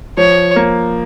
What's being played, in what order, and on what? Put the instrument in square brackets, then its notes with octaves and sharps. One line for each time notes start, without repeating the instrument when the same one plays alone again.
[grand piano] F3 [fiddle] C#5
[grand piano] A#3